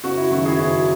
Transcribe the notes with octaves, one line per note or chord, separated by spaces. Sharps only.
F#1 F#4
E4
F#2 D#3 F#4
E4 G#4
F#1 F#4